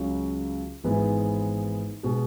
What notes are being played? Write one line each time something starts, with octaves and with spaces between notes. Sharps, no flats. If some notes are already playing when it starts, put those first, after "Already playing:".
Already playing: C#2 C#3 F#3
G#1 G#2 E3 G#3 B3
B2 G#3